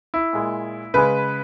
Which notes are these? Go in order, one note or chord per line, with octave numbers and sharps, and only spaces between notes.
E4
A#2 G#3
C#3 G#3 B4